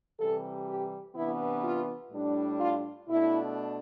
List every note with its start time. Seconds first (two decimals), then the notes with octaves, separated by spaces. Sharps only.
0.19 C3 E3 G3 A4
0.68 G4
1.15 C3 E3 B3 D4 E4
1.64 F4
2.12 A2 G3 D4
2.60 F4
3.09 B2 A3 D4 E4